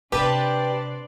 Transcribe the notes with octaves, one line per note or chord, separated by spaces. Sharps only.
C3 D4 G4 B4 C5 D5 A5